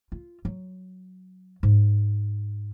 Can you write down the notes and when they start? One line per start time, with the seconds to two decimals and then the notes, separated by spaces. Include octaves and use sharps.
0.12 F4
0.45 F#3
1.63 G#2